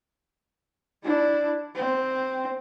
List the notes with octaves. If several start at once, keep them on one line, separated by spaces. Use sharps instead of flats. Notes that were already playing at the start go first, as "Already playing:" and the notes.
D4 E4
C4